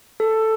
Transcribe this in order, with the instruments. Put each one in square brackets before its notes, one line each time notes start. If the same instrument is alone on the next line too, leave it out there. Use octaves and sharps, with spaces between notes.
[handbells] A4